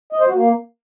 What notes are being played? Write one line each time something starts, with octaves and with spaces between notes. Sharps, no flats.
D#5
C5
F#4
A#3